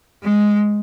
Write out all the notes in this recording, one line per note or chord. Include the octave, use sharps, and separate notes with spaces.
G#3